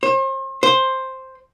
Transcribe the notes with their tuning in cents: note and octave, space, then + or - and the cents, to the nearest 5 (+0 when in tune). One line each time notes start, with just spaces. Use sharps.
C5 +40
C5 +5